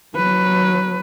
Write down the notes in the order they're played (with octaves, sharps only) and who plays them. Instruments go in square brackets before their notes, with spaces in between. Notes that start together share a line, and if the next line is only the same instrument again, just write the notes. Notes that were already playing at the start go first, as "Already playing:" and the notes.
[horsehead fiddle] F#3 B4